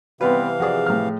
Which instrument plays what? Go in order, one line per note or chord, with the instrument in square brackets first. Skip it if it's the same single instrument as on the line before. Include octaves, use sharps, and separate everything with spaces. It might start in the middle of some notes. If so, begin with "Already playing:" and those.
[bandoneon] C3 E3 F5 [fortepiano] G3 B3 C4 [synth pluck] B4
[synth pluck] F3 G#4 [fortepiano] F#4 D5
[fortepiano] A2 F6